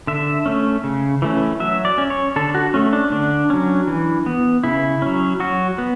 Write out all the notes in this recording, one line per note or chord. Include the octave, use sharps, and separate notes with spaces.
D3 E5
A3 C#4
C#3
E3 A3 C#4
F#3 E5
D5
C#4
C#5
D3 A4
F#4
A3 C#4
D4
D3 D4
F#3 C#4
E3
B3
C#3 E4
F#3 C#4
F#3 F#4
B3